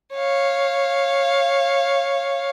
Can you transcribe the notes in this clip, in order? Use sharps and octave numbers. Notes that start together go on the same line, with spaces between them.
C#5 F5